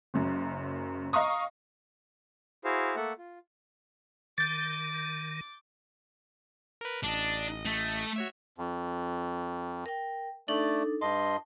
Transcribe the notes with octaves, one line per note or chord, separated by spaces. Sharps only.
F#1 F#2
D#5 F5 A#5 C#6 D#6
E4 F#4 G#4 C5 F5
A3 A#3 A4 E5 F#5
F4
D#3 D6 G6 A6
A#4 B4
A1 D4 D#5
A3
F#4 C#5 E5
F2
A#4 G5
A3 D4 D#4 A4 D5
G2 D#5 A5 C6